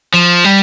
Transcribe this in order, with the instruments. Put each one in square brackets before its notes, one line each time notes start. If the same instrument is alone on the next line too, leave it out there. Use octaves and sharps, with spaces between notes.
[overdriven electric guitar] F3
G3